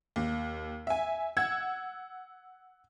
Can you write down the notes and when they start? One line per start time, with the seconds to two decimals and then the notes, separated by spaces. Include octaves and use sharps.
0.16 D#2
0.87 E5 G#5
1.37 F#5 E6 G#6